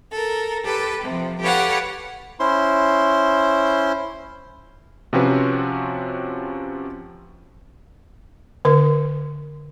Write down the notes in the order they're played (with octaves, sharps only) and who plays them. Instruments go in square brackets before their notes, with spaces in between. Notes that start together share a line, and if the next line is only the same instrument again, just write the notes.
[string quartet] A4 A#4
G4 A4 B4
C3 F3
G4 A4 B4 C#5 F5 F#5
[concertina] C#4 E4 C5 C6
[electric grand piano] C3 F3 C4 C#4 F#4 B4
[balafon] D3 A#4